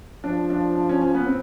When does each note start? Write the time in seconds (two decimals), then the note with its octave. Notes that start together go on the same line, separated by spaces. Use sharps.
0.24 F3 D4
0.50 D4
0.76 D4
0.89 C#4
1.01 C#4
1.14 B3
1.27 C4